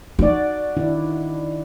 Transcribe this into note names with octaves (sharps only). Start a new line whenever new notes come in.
D#4 F#4 D5
D#3 D4 E4